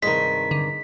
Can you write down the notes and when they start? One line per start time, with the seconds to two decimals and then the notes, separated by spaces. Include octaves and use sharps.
0.03 G2 C3 D#3 G#3 B6
0.51 D3